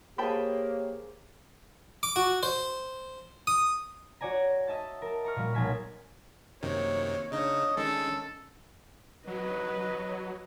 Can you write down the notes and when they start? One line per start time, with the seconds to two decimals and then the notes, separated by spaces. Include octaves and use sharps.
0.18 A#3 G4 G#4 C5 C#5 G5 A5 B5
2.03 D6
2.16 F#4
2.43 C5
3.47 D#6
4.21 F#4 C#5 D5 G#5 A#5
4.67 D#5 E5 A5 A6
5.02 A#4 A5
5.25 A#5 C#6 F6
5.36 A#2 G3
5.54 B1 F#3 A#3 G#5 A5 B6
6.63 F#2 C3 D#3 A#3 C#5
7.32 C#3 D4 D#4 C#5 D#5
7.77 D#3 G#3 C#4 D4 A4
9.27 F#3 B4 D#5